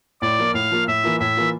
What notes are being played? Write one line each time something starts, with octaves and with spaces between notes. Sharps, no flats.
A2 D5
F3 A#3 F4
A2 F5
F3 A#3 F4
A2 E5
E3 A#3 F4
A2 E5
E3 A#3 F4